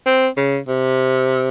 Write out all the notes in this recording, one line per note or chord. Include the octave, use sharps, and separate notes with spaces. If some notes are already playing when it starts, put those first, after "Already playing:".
C4
C#3
C3